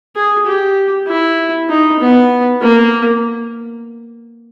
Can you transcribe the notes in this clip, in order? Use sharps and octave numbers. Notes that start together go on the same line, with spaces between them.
G#4
G4
E4
D#4
B3
A#3